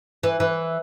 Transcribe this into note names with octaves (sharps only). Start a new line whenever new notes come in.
E3
E3